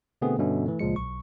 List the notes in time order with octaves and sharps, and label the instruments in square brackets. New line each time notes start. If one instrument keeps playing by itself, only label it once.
[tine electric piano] B2 D3 A3 B3 C4 G#4
G2 B2 D3 C#4 E5
E3 A3
C#2 A#2 F3 G#3 C#7
B1 C#6